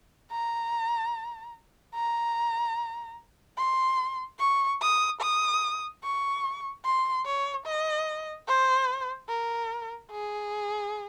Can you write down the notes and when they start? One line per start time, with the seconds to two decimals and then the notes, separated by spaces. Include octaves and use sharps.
0.32 A#5
1.95 A#5
3.58 C6
4.39 C#6
4.81 D#6
5.21 D#6
6.04 C#6
6.85 C6
7.26 C#5
7.66 D#5
8.48 C5
9.29 A#4
10.11 G#4